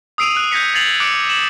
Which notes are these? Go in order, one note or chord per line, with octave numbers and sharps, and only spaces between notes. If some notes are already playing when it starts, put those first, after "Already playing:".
D#6 E6 C7 D7 D#7 F7
F#6
G6 G#6 A#6 B6 C#7
G#6 A6 B6 C7 F7 F#7
D6 F#6 C#7 D7
E7 F#7